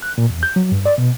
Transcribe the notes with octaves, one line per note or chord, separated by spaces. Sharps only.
F#6
A#2
E2
G6
F#3
G2
D5
B2